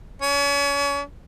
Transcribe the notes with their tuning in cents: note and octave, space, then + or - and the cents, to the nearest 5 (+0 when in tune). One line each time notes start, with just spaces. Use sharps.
C#4 +35